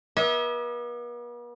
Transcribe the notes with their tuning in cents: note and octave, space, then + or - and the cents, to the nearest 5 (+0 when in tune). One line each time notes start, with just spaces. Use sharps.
B3 -45 E5 -35